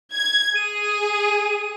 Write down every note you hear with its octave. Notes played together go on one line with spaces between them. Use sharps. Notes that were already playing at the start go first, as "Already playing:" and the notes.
G#6
G#4 D#7